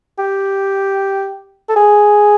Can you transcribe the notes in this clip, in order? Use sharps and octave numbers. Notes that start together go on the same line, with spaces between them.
G4
A4
G#4